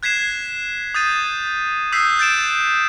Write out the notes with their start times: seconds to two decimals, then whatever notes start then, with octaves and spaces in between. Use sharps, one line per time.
0.03 F#6 G#6 B6 C7 E7
0.94 D#6 G6 A6 D#7
1.92 D#6 E6 F#6 G6 B6 C7
2.19 G6 A6 D7 E7